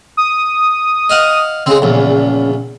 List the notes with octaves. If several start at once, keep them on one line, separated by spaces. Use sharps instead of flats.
D#6
D#5 F5 F#5
C#3 G#3 C4
A#1 E2